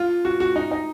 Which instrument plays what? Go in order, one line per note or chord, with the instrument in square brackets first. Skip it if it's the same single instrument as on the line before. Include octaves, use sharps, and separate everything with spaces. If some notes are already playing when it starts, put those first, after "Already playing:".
Already playing: [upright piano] F4
F#4
F#4
D#4
D#4